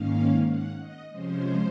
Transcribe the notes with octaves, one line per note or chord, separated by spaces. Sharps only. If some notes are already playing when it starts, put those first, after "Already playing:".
Already playing: G#2 D#3 A#3 C#4 F5
F#5
D#5
C3 F3 G#3 C#4 C5